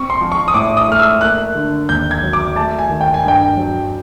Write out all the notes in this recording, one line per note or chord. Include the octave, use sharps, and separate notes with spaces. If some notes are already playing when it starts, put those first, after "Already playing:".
Already playing: C4 C#6
C6
F3
C#6
D#6
A2 D6
D#6
A3 F6
E6
A#3 F#6
D3
D#2 G6
G#6
F#3
D6
A3 A5
G#5
D#3
G5
G#5
G2
G5
F#3